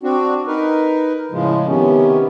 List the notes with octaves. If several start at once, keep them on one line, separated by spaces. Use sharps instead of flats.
C4 D4 F#4
D#4 A#4 B4
A2 C#3 F3 G#3
C3 D#3 B3 C#4